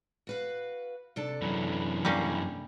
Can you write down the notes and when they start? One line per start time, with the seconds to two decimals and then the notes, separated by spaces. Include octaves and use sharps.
0.27 F#4 B4 F5
1.16 C3 D4 A4
1.42 F#2 E3
2.05 G3 A#3 C#4